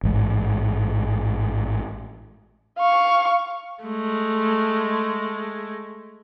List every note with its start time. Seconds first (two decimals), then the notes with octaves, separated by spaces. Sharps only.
0.03 A1 G#2
2.79 F5 C#6
3.84 G#3 A3